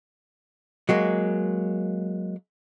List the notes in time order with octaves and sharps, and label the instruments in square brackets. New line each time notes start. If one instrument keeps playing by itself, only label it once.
[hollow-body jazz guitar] F#3 G#3 A#3